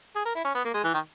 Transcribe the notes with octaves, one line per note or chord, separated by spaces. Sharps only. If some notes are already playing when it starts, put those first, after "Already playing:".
G#4
A#4
E4
C#4
B3
A#3
G#3
E3
D#3